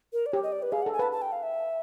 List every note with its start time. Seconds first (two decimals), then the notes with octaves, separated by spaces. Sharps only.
0.13 A#4
0.26 D5
0.32 G4 C#5
0.43 D#5
0.52 D5
0.62 B4
0.72 G#4 F5
0.82 A4 F#5
0.93 G#5
0.99 B4 A5
1.12 A5
1.22 G5
1.32 F5
1.43 E5